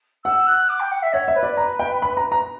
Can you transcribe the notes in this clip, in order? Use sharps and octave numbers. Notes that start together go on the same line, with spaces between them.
F#5 E6
F#6
D6
G5
F#5
E5
C#5 F#5
E5
B4
D5
A#5
G5
B5
A#5
A#5